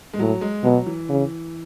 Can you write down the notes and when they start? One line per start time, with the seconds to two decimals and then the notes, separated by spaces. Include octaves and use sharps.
0.13 G#3
0.19 A2 F#3
0.41 G#3
0.64 B2 F#3
0.86 E3
1.09 C#3